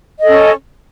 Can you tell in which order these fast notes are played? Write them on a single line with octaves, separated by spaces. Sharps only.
D#5 A4 C#4